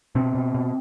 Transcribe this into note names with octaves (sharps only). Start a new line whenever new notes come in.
B2 C4
B2
B2